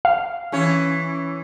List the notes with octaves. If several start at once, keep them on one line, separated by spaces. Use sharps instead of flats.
F5
E3 C#4 C#5